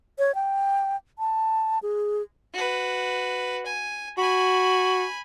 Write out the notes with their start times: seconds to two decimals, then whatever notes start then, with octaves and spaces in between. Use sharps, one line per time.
0.19 C#5
0.35 G5
1.19 A5
1.83 G#4
2.54 F#4 B4
3.66 G#5
4.18 F#4 G#5 B5